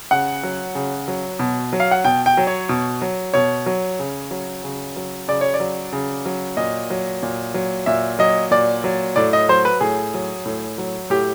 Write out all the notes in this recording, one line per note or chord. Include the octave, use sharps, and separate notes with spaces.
C#3 F#5
F#3
C#3
F#3
B2
F#3
F5
F#5
B2 G5
G5
F#3
C#5
B2
F#3
B2 C#5
F#3
C#3
F#3
C#3
F#3
C#3 D5
C#5
D5
F#3
C#3
F#3
A#2 D#5
F#3
A#2
F#3
A#2 E5
F#3 D#5
A#2 D5
F#3
A2 D5
D#5
F#3 C5
B4
A2 G#4
F#3
A2
F#3
A2 G4